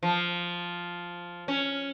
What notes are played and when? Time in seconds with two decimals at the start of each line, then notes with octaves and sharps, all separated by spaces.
0.03 F3
1.48 C#4